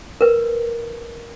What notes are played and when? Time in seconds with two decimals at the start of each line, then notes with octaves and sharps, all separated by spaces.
0.21 A#4 B4